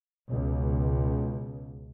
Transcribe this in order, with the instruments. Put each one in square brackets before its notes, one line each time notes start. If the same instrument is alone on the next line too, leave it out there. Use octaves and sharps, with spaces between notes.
[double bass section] C#2 B2